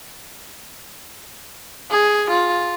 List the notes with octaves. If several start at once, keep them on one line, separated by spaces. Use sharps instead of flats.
G#4
F4